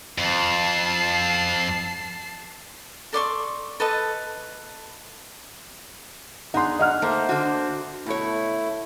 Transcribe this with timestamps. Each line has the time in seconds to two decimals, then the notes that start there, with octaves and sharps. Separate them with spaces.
0.18 F2 A5 C7
3.13 A4 D5 C6 C#6
3.80 A4 B4 D#5 A5
6.54 D4 D#4 G#4 F#5 C6
6.79 D#5 F#5 F6
7.02 A3 A#3 C5
7.29 D3 F#4
8.06 B2 A3 E4 C#5